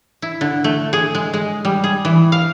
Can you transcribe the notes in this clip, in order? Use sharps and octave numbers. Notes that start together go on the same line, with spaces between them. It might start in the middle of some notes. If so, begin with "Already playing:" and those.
E4
D3
A3
G#4
G#3
G#3
G3
G#4
E3
F5